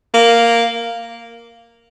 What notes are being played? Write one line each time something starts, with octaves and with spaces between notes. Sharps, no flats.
A#3